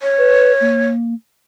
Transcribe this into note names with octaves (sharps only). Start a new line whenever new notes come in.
C#5
B4
A#3